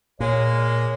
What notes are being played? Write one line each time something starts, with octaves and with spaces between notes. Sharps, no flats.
A#2 G#3 A#3 C#5